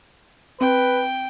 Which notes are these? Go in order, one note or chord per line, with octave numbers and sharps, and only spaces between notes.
C4 B4 G5